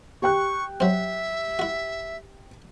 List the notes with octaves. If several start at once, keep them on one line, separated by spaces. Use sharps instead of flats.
G4 G5 C#6 F#6
F#3 C4 E5
E4 F#4